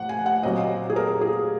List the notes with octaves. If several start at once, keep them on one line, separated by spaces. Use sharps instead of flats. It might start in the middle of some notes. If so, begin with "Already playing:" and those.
Already playing: A#2 F3 F#5
G#5
F#5
A#2 F#3 C4 D#5
G#4
A#4
G#4